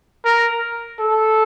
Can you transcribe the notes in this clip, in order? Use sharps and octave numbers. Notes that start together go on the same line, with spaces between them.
A#4
A4